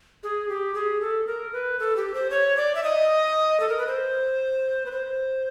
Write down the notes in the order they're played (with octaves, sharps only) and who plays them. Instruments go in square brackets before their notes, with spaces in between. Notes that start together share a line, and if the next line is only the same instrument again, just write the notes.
[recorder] G#4
G4
G#4
A4
A#4
B4
A4
G4
C5
C#5
D5
E5
D#5
A4
A#4
B4
C5
B4
C5